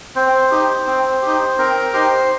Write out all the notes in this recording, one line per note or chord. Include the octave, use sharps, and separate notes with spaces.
C4 C5
D#4 G4
C4
D#4 G4
C4 A#4
D#4 G4 C5